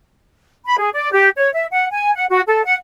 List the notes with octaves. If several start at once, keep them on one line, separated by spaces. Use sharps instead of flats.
B5
G#4
D5
G4
C#5
E5
F#5
G#5
F#5
F#4
A4
F#5